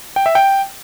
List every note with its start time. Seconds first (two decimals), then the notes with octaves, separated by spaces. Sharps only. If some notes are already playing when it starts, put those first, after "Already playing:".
0.16 G5
0.26 E5
0.35 G5